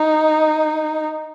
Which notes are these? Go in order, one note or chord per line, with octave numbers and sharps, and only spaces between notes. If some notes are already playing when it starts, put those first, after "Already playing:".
Already playing: D#4